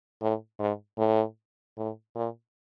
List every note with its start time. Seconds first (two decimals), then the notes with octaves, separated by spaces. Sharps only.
0.21 A2
0.59 G#2
0.98 A2
1.77 A2
2.15 A#2